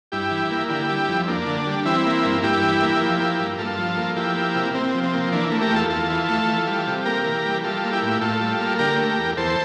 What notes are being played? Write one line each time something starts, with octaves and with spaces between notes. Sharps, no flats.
G2 E4 G4
E3
A#3
D3 E4 G4
G3
F2
A#3 D4
D3
G3
E3 C4 E4
A#3
G2
G2 E4 G4
E3
A#3
F3
A#3
G2
G2 F4 A4
F3
A#3
F3 E4 G4
A#3
C3
C3 C4
F3
C4
A#3
E3 D4
A3
G4 A#4
E2 F4 A4
E2 F4 A4
E3
A3
E3
G3
C3
A#3 G4 A#4
E3
G3
G3 F4 A4
A#3
E4 G4
A2
A2 F4 A4
G3
A#3
D3 G4 A#4
A3
E2
E2 A4 C5